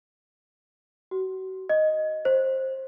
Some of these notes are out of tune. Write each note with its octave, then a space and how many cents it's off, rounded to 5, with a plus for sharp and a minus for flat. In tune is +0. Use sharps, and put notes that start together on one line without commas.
F#4 +35
D#5 +0
C5 +15